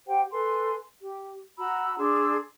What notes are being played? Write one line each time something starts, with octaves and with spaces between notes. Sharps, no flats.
G4 C5 F#5 G5
A4 B4 G#5 C6
G4
F#4 A#5 B5 E6
D4 G#4 C6 E6